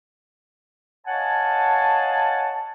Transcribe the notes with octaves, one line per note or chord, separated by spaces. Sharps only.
C#5 D#5 F5 F#5 G#5 A5